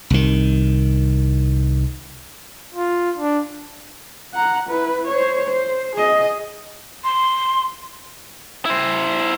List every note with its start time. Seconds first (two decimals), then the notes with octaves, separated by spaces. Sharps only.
0.10 C2 D#3
2.75 F4
3.18 D4
4.34 F#5 A#5
4.69 E4 B4
5.08 C5 C#5
5.49 C5
5.96 G#4 D#5
7.04 C6
8.65 E4 C5